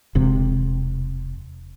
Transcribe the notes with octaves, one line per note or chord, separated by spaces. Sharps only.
E1 C3